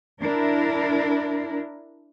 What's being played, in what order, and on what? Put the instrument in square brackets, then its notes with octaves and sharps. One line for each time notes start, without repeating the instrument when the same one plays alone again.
[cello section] D4 E4 A#4